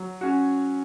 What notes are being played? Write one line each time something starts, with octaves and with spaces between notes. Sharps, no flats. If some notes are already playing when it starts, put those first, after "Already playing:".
Already playing: F#3
C#4 F#4